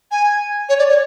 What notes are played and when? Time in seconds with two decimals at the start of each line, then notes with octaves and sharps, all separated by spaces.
0.11 G#5
0.69 C#5
0.79 D5
0.89 C#5